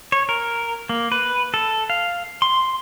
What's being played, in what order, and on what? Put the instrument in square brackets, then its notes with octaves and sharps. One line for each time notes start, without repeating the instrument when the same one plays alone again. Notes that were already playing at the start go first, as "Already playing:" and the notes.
[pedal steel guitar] C#5
A#4
A#3
B4
A4
F5
C6